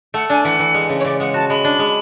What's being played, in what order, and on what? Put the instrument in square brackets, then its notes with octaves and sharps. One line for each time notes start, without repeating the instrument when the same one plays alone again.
[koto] A3 [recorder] F#5
[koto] D4 [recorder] G#5
[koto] E3 [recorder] F#5
[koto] E3
G#3
C#3
[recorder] C#5
[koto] C#3 [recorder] D5
[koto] G#3 [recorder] F#5
[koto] F#4 [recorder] A5
[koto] G#3 [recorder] B5
[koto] D4
G#3